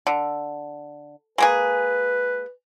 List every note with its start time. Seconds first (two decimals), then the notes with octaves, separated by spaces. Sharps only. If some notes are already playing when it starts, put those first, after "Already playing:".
0.07 D3
1.38 G#3 A#3 G#4 B4